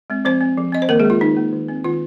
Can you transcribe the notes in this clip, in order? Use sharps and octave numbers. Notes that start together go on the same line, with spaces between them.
G#3 C4
F3 C4 C5
C4
F3
C4 D#5
C5
D#3 A#3 A#4
G#3 G#4
A#3
F4
D#3 D#4
A#3
D#3
C4
D#3 F4